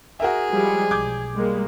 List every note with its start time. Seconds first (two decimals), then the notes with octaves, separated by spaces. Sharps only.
0.20 F#4 G#4 A#4 E5
0.51 F3 G3 G#3
0.91 B1 D6 G6 G#6
1.34 G3 G#3 A#3